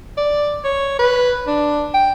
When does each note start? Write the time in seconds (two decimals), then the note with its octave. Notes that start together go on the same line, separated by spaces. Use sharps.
0.18 D5
0.64 C#5
0.99 B4
1.47 D4
1.94 G5